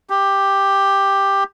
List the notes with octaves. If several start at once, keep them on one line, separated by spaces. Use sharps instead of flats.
G4